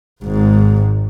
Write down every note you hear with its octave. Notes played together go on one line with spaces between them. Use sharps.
G#1 G#2